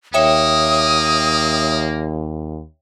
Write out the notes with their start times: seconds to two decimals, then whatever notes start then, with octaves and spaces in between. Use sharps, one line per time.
0.14 D#2 A#3 C#5 E5 G5 D#6